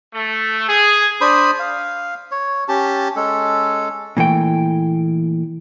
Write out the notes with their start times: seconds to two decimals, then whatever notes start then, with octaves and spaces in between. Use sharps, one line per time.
0.14 A3
0.69 G#4
1.21 D4 C5 B5 D#6
1.59 F5
2.31 C#5
2.68 C#4 G4 A5
3.16 G#3 C#4 A4
4.17 A#2 E3 A3 G5